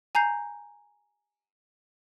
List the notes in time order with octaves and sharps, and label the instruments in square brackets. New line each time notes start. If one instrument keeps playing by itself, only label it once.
[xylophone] G#5 A#5 G6 C7